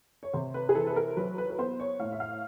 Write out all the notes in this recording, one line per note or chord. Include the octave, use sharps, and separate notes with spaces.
C#5
C3 C5
B4
G#4
E3 A4
B4
A#4
F#3 B4
B4
B4
B3 C5
C#5
A2 F5
E5
F5